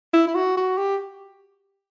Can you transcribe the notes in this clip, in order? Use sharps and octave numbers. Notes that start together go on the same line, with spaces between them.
E4
E4
F#4
F#4
G4